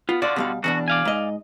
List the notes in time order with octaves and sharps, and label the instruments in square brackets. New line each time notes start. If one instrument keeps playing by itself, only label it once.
[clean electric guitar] B3 [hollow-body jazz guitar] F4
[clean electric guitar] D3 F4 F#4 [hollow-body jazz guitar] D5
[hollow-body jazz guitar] B2 G3 F5
[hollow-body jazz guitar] E2 B2 D4 [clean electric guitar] F#4
[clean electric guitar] D5 F5 G#5
[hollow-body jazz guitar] G#2 D#5